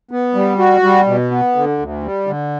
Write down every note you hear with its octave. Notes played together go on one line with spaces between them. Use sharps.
B3
G3
F#4
G3
B2
B3
D3
D2
G3
D3